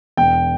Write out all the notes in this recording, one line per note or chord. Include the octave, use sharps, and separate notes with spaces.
E1 G5